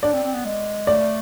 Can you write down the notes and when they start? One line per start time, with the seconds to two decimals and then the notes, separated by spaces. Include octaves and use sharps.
0.03 D4 D5
0.13 C4
0.24 C4
0.35 B3
0.45 G#3
0.87 A3 D5